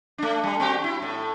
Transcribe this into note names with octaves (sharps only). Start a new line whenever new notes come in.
A3 D4
G3
C4 F#4 G4
E4
A2